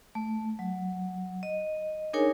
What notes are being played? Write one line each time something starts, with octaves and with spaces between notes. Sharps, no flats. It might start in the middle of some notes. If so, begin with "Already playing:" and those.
A3
F#3
D#5
D4 D#4 G#4 A#4 C#5 G#5